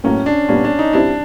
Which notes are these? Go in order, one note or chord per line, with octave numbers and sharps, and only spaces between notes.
A2 F#3 A#3 C#4
D4
A#2 G3 B3 C#4
D4
D#4
G3 C4 D4 E4 G4